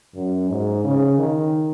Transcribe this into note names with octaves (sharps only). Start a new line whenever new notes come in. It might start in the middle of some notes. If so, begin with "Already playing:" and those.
F#2
G#2
C#3
D#3